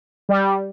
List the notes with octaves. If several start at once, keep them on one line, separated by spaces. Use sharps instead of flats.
G3